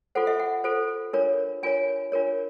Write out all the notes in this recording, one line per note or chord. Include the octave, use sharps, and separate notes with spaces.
F4 A4 C5 F#5
E5
F#5
F4 A4 C5
D4 F4 A#4 C#5
D4 F4 A#4 C#5 G#5
D4 F4 A#4 C#5